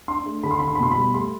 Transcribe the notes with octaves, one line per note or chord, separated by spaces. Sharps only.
D4 C6
A3
D3 B5
C6
D3 B5
C6
B5
B2 C6
B5
G3
A3 C6